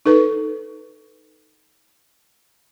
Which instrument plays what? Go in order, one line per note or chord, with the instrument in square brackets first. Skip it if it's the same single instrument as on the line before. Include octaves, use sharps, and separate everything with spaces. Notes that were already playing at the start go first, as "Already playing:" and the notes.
[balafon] D#4 A4 B4